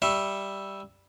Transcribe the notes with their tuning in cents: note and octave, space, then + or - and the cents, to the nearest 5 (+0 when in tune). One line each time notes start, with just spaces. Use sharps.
G3 +0 E5 +0 C#6 -30